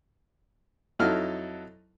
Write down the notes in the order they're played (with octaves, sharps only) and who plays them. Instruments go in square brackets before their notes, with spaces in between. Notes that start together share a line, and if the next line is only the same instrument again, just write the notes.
[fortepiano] F2 F#3 D#4 E4 A4 F6